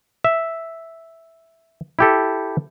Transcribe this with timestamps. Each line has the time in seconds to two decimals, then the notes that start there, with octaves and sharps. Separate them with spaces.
0.24 E5
1.99 E4 G4 A4